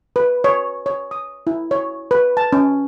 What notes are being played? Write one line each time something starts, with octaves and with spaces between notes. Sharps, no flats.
B4
C#5
C#5
D#6
E4
C#5
B4
A5
C#4